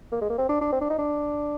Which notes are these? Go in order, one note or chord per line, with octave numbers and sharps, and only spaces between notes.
A#3
G#3
A#3
C4
D4
D4
C4
D4
D#4
D4